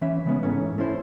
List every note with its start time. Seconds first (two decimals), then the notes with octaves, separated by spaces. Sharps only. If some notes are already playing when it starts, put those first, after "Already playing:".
0.01 E3 C#4 E5
0.26 C#3 G#3 B3 C#4
0.43 G#2 E3 A3 C#4
0.78 A3 C#4 E4 C5